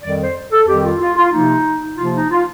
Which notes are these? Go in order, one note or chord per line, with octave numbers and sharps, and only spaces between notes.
F2 D#3 G3 D5
C5
A4
F2 D#3 G3 G4
F4
F4
F4
C3 F3 A#3 D#4
C3 F3 A#3 F4
D#4
F4